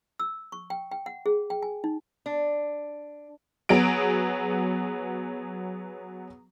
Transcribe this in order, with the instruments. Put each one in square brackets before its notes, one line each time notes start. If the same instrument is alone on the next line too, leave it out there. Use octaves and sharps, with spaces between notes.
[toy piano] E6
C#6
G5
G5
F#5
G#4
G5
G#5
D#4
[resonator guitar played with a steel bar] D4
[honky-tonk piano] F#3 B3 G#4 D7